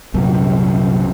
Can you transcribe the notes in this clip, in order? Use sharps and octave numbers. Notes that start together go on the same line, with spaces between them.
C2 F#2 A#2